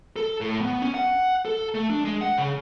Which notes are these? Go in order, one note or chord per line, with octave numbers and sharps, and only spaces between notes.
A4
A2
B3
C#4
F#5
A4
A3
D4
G#3
F#5
C#3